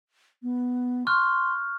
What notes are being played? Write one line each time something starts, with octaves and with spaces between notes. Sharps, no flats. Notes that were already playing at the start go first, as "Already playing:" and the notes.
B3
C6 C#6 F6 F#6